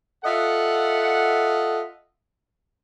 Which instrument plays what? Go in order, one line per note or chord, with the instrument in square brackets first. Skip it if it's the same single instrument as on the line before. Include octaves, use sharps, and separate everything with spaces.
[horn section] F4 A4 D#5 E5 F#5